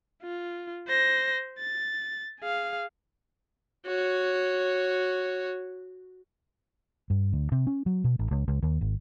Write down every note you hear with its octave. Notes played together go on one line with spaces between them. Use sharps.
F4
C5 A#6
A6
G#4 F5
F#4 C#5
G2
D2
C3
C#4
F#3
B2
A1
C#2
C#2
D#2
G#1